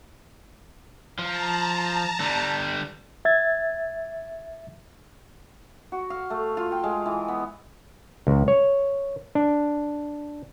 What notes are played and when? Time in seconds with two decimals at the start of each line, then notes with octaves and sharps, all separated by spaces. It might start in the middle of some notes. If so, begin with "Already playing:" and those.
1.19 F3 A5 A#5
2.20 D3 G3
3.25 E5 G#6 A6
5.92 F#4
6.10 F5
6.30 A3
6.57 F4
6.72 G5
6.83 G#3
7.06 E3
7.28 B3
8.27 C#2
8.48 C#5
9.35 D4